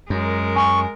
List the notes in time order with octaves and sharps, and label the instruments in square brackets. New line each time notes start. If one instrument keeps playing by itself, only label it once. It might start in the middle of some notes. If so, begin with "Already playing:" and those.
[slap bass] F#2 [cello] G#3 A#4
[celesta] G#5 [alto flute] C#6